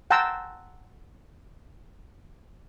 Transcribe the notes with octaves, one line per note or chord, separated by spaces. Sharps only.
F#5 G5 A5 A#5 C6 E6